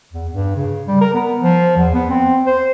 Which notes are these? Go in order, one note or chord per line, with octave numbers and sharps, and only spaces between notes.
E2
G2
C#3
G3
A#4
B3
F3
E2
B3
C4
C5